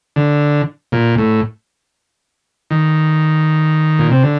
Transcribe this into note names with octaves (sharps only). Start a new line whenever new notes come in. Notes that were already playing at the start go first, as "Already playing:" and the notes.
D3
A#2
A2
D#3
A#2
C3
D3